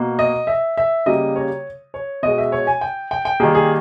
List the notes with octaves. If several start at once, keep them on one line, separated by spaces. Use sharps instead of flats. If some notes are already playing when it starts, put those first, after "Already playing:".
Already playing: B2 A#3
D#5
E5
E5
C#3 G3 A#3 D#5
C#5
C#5
B2 G#3 D#5
E5
C#5
G#5
G5
G5
G5
D#3 G3 A#3 G#4
G#4